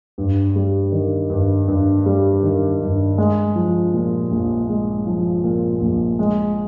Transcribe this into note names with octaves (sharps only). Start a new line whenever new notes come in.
G2
G3
D#3
G2
G2
G3
D#3
G2
G#3
F3
A#2
A#1
G#3
F3
A#2
A#1
G#3